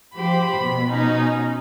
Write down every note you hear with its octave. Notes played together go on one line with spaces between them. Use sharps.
F3 G4 C5 B5
B2
C#4 D#4